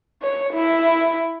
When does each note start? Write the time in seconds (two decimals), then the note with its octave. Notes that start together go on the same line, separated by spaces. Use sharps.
0.22 C#5
0.53 E4